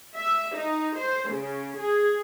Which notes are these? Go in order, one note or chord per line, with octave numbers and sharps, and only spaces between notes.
E5
D#4
C5
C#3
G#4